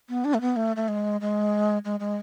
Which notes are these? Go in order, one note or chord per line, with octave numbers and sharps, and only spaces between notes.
B3
D4
A3
B3
A3
A3
G#3
G#3
G#3
G#3